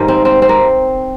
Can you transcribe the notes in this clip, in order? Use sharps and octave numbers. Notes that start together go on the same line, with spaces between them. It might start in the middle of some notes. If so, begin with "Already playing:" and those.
Already playing: G#2 D#3 G3 A#3
C4
C4
C4
A#3